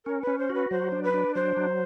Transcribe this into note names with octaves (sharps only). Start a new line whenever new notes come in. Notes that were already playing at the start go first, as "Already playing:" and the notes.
C#4 A#4
B4
C#4
C5
F#4 B4
F#3 C5
D4
B4
D4
F#3 C5
F#3